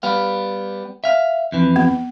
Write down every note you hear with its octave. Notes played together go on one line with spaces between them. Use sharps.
G3 B3 F5
E5 F5
F2 E3
B3